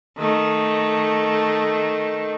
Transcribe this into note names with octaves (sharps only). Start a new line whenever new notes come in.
D#3 A3